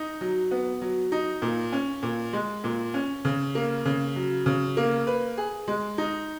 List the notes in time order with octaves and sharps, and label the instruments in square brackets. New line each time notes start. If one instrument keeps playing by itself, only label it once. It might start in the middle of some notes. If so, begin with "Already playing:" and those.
Already playing: [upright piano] D#4
F#3
B3
F#3
D#4
A#2
C#4
A#2
G#3
A#2
C#4
C#3
A#3
C#3
F#3
C#3
A#3
B4
G#4
G#3
D#4